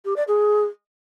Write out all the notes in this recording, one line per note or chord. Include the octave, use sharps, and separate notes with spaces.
G4
D5
G#4